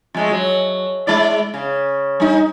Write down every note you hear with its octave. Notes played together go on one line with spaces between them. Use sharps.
F2 G#3 A3
F#3
G#3 E4 D5
C#3
G3 D#4